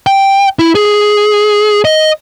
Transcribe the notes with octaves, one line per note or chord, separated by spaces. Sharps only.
G5
E4
G#4
D#5